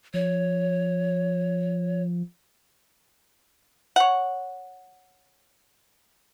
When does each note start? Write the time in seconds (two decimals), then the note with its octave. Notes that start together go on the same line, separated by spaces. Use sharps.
0.14 F3 C#5
3.96 C#5 F#5